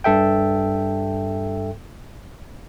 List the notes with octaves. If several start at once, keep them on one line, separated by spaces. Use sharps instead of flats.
G2 A4 E5 G5